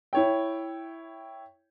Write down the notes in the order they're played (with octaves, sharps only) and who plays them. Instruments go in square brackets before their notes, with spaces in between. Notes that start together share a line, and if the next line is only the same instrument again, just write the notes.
[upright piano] E4 C#5 G5